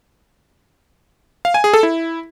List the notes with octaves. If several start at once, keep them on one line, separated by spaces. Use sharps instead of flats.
F5
G#5
G#4
A4
E4